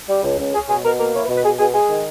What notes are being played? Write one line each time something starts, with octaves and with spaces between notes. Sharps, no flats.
G3
C#2
C#2
C#4 G#4
B2 G#4
B2 A#4
A#3 A#4
E4 C#5
B4
B2
B4
B2 G#4
B2 G#4
G#3 G#4
D#3